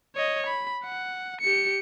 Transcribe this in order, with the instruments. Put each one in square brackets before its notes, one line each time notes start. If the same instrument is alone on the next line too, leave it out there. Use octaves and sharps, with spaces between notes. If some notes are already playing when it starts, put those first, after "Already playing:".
[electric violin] C#5 D#5
B5
F#5
G4 C#7